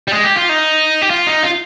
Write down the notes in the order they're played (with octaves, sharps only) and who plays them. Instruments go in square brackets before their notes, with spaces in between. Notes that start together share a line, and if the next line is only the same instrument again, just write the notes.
[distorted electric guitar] G3
G#3
G4
F4
D#4
G4
F4
D#4
F4